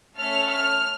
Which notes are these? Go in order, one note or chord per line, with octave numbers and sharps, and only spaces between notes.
A3 C#4 A4 F6
F6